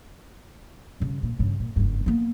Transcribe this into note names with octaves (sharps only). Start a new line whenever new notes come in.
G2 C#3
A#2
G2 C#3
A#2
F#1 G2
A#3 B3